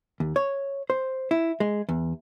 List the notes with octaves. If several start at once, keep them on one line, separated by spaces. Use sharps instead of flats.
D#2
C#5
C5
E4
G#3
E2